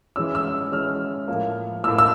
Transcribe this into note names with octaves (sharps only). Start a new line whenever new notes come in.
E3 G#3 C#4 E6
E6
E3 G#3 C#4 F6
A2 F3 A#3
A2 F3 A#3 E6
E6